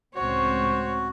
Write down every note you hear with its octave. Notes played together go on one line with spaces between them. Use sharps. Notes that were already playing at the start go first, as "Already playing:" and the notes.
C#2 A2 C4 F#4 C5 C#5